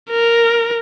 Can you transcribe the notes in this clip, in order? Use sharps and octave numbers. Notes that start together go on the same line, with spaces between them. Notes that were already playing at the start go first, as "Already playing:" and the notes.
A#4